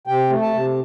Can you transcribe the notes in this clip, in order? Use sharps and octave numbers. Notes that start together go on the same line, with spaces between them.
C3 G5
A3
A5
C3